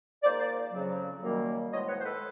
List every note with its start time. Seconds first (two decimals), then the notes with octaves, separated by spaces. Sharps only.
0.23 G#2 F3 A#3 C5 D5
0.40 C5 D5
0.72 F2 C#3 F#3
1.22 F#2 D#3 G3 A#3
1.72 A2 F3 G#3 B3 C#5 D#5
1.88 B4 C#5
1.99 C5
2.04 A4 B4